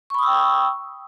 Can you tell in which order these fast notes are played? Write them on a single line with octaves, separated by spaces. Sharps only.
C#6 B5 D#6 E6 G5